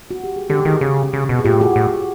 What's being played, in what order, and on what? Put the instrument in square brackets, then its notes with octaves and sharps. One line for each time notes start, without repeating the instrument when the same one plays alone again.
[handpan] F#4
G4
G#4
[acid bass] D3 [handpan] G4 A4
[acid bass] D#3 [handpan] F#4 G#4
[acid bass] C#3
C#3
B2
[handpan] G#4
[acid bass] A2 [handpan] F4 G4
[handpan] F#4 G#4
[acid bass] A2